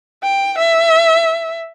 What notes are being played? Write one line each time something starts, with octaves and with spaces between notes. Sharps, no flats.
G5
E5